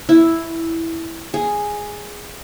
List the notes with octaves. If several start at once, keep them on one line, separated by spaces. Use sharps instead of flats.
E4
G#4